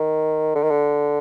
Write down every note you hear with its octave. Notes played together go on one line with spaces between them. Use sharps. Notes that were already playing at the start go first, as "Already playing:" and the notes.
Already playing: D#3
D3
D#3
D3